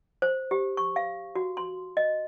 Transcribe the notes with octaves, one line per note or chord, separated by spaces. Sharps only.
C5
G4
C#6
F5
F#4
C6
D#5